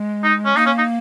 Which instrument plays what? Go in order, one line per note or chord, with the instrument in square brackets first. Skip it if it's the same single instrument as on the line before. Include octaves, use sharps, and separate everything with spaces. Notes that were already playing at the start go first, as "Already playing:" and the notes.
Already playing: [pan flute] G#3
[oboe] D#4
C#4
[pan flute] A#3 [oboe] D#4
[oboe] C#4
D#4